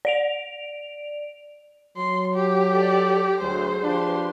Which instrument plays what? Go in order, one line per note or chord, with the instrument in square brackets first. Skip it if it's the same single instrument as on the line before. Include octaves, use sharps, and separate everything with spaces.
[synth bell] D5 D7 F7
[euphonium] F#3 [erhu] C6
[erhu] G4
[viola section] A4 D5
[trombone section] D2 [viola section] F#3 C6 [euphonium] G#4 [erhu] C5
[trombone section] F3 D4 [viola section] G4 B4 C6